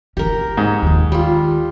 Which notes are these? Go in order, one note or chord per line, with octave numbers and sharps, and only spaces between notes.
D3 C#4 G4 A#4
G#2
D#2 D#3
G3 F4